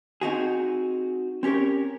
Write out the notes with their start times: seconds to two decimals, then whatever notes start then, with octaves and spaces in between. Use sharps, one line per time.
0.21 C4 D#4 F#4 G#4
1.43 C4 C#4 G4 A#4 C#5